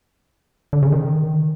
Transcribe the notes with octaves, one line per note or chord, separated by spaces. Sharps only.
D3
C#3
D#3